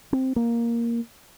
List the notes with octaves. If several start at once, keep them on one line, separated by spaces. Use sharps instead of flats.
C4
A#3